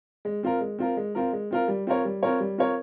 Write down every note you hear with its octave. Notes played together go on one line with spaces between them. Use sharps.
G#3
C4 F4 A#4
G#3
C4 F4 A#4
G#3
C4 F4 A#4
G#3
C4 F4 A#4
G3
C4 F4 A#4 C#5
G3
C4 F4 A#4 C#5
G3
C4 F4 A#4 C#5